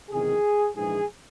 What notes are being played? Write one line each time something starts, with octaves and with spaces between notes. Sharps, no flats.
F#1 E2 C3 D#3 G#4
A#1 G#2 E3 G#4